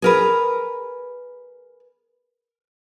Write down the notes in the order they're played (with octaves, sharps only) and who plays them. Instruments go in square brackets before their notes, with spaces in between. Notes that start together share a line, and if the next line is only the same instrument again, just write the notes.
[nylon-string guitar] G#4 A#4 B4